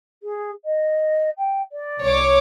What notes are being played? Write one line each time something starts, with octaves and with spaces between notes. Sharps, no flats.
G#4
D#5
G5
D5
C2 C#5 D6